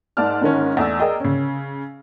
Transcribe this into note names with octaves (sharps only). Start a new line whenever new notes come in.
G#2 A#3 D5 A5 F6
G#2 D#3 C#4
E2 A3 D5 E6
G#4 A#4 D5 D#5 G5
C#3 C#4